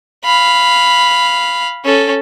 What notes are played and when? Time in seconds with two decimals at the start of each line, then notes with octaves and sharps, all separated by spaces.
0.24 F5 B5
1.85 C#4 A4